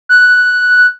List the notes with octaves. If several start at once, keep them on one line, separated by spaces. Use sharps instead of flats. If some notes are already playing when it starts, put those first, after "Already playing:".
F#6